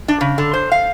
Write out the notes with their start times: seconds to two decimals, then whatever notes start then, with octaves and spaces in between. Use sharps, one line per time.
0.08 D4
0.21 C#3
0.38 D3
0.54 C5
0.72 F5